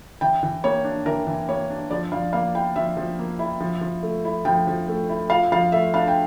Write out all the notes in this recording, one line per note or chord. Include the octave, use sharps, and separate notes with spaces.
E3 G5
E3
A#3 C#5
D4
E3 A#4
E3
A#3 C#5
D4
F3 D5
F3 F5
A#3 F5
E4 G5
F3 E5
F3
A#3
E4
F3
F3
A3
E4
F3 G5
F3
A3
E4
F4 F5
F3 F5
A3 E5
D4 F5
G5